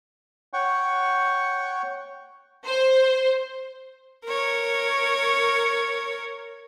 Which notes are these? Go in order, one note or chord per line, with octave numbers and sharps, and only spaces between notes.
C#5 F#5 G5 C#6
C5
A#4 C#5